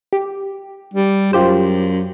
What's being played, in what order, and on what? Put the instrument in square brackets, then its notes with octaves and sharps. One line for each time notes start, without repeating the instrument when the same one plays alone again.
[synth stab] G4
[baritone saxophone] G3
[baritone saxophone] F#2 [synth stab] F4 G4 C5